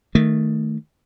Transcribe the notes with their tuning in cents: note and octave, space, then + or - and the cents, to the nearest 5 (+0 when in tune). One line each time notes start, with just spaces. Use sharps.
D#3 +0 A3 +0